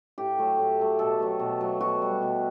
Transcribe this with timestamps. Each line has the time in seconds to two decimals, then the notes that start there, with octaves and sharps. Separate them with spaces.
0.18 A2 G4
0.38 F#3 A3
0.59 A2
0.79 F#3 A3
0.99 B2 A4
1.19 F#3 A3
1.39 B2
1.61 F#3 A3
1.80 B2 F#4
2.02 G3
2.22 B2